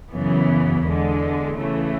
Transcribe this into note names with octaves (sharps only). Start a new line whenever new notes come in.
F#2 C#3 E3 B3
E2 D3 G#3
C#3 E3 A3